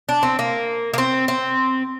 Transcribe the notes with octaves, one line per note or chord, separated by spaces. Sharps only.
D4
C4
A#3
A#3
C4
C4